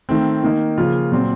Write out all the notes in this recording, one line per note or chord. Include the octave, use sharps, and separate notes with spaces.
D#3 A3 C4
D#3 A#3 D#4
C#3 F3 A#3 F4
A#2 F#3 C4